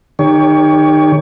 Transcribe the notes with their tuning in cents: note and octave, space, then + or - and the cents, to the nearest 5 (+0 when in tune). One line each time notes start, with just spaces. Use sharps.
D#3 -25 G4 +25 C#5 +25